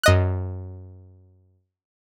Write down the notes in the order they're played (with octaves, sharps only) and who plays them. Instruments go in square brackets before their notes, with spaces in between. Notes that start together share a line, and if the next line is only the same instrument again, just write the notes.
[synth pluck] F#2 D#5 F#6